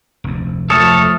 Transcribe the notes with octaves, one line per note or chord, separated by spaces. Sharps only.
F1 D2
F3 A3 A4 C#5 A5 D#6 F6 A6